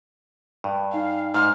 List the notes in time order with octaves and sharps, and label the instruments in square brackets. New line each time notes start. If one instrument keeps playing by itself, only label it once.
[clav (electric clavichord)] G2
[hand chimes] D#4 G#5 [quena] F5
[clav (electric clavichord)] G#2 [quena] F6